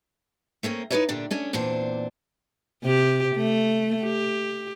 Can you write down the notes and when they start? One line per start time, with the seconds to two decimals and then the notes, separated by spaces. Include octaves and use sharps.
0.63 A3 A#3 C4 C#4
0.91 D#4 E4 F#4 B4 C#5 E5
1.09 A#2 D3 D4 G4
1.31 A3 C#4 D4
1.53 E2 A#2 C4 D4 C5
2.83 C3 G4
3.36 A3
4.03 G4